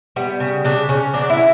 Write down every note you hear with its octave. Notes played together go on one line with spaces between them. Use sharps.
G3 B3
C#3
C#3 D4
C#3 C#4
F#3 D4
E4
F#3